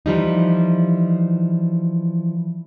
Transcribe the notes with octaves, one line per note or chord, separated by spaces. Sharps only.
E3 F3 G3 D#4